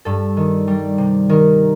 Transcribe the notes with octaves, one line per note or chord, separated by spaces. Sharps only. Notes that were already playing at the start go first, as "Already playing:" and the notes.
G2 A4
D#3
G3
C3
D#3 A#4